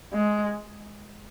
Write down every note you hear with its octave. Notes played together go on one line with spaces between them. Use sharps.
G#3